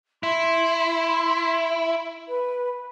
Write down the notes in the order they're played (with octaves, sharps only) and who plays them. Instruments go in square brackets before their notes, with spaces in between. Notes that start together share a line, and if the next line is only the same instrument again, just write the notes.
[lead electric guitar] E4 [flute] C6
[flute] B4